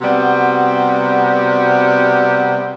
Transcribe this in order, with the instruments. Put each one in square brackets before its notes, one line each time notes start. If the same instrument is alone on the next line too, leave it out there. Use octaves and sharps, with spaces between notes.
[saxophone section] C3 G3 B3 F#4